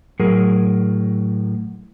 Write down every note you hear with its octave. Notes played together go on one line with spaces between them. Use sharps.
A2 F#3 G#4 A#4